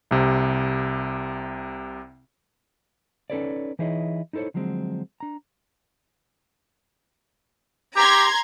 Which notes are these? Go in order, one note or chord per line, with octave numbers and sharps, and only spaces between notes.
C2 C3
C#4 D#4 A4 B4 C#5 D5
E3 D#4 E4 G#4 C#5 D#5
D#4 E4 A4 C5 C#5
D3 F3 F#3 G#3 C4
D4 A#5
G4 A#5 C6 G#6